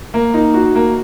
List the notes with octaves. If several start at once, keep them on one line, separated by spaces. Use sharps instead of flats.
A#3
D#4
F#4
A#3